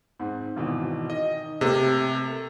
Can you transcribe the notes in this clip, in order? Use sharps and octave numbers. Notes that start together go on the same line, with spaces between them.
G#2 C4
G#1 B2 E3
D#3 D#5
C3 A3 A#3